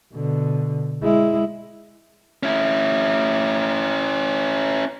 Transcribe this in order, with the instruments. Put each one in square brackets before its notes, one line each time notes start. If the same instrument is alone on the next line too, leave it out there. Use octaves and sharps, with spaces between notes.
[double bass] B2 D3
G#3 E4
[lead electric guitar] C#4 E4